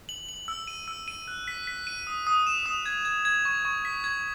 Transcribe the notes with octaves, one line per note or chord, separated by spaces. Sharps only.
F#7
F#7
E6
D#7
E6
D#7
F#6
B6
B6
D#7
D#6
D#6
E7
D#6
G#6
G#6
G#6
C#6
C#6
B6
G#6